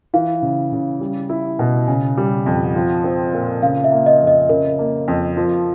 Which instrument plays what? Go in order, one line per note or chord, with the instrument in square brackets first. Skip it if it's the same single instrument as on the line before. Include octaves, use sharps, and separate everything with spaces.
[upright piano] E3 [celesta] F5
[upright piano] C#3
C#3
G3
E4
B2
[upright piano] C#3 [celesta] G#5
[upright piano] G3
F2
[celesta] F#5
[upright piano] F3 [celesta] G5
[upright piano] C4
A#2
[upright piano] C#3 [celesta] F5
[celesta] E5
[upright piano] A#3
[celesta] D#5
[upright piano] F2
[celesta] D#5
[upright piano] C#3 [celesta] A#4
[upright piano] A#3
F2
F3